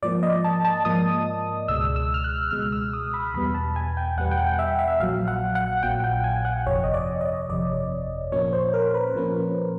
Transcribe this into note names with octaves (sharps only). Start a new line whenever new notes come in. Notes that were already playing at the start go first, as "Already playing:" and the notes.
G#2 F3 A#3 D5
D#5
A5
A5
G#2 F3 A#3 D#6
C#2 B2 G#3 E6
E6
F6
F#6
C#2 B2 G#3 F6
E6
D#6
B5
E2 B2 G3 B3 B5
A5
G#5
G5
E2 B2 G3 B3 F#5
G5
F#5
E5
E5
A#1 A#2 F#3 F5
F#5
F#5
A#1 A#2 F#3 G5
G5
G#5
F#5
G1 F2 C3 C#5
D#5
D5
D#5
G1 F2 C3 D5
A#2 F3 A#3 C#4 C#5
C5
A#4
B4
A#2 F3 A#3 C#4